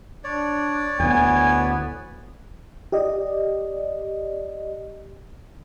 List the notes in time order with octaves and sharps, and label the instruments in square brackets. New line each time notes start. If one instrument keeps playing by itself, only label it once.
[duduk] D4 [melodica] C#5 D5
[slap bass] D2 A2 [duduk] B3 [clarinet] G#5
[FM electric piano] G4 D5 D#5